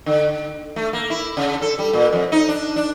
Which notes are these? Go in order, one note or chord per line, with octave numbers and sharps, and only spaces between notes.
D3
A3
A#3
E4
C#3
A4
G3
A#2
F2
D#4
D4
D4